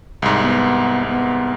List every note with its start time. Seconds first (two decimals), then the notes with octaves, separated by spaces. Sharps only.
0.22 C2 G#2
0.40 B3
1.08 B3